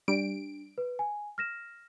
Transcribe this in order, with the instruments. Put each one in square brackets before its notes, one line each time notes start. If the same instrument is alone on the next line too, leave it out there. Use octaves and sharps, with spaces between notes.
[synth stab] G3 D7 [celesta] D4
[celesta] B4
G#5
F6 A#6 E7